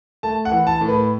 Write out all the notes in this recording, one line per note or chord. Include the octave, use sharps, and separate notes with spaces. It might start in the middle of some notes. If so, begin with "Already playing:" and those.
A3 A5
F#5
E3
A5
A2
B4